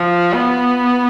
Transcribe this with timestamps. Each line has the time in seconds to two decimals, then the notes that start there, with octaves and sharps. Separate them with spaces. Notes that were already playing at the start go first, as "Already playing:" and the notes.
Already playing: F3
0.34 B3